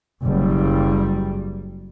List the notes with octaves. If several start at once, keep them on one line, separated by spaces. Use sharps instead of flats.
F#1 G3